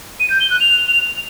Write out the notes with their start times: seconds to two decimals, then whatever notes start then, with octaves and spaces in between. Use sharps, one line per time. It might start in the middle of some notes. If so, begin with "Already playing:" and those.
0.20 D#7
0.30 G6
0.40 G7
0.50 F#6
0.60 F7